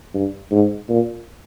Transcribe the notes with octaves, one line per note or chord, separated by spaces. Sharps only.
G2
G#2
A#2